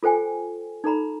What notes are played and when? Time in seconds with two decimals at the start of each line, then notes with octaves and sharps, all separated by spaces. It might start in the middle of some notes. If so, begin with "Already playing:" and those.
0.03 F4 A4 C5 G5 G#5
0.84 D#4 A4 A#5 B5